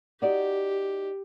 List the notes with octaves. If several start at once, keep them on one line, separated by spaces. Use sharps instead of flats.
D#4 F#4 G4 D5